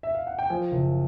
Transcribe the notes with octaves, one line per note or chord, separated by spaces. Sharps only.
E5
F5
F#5
G5
F3 G#5
F#1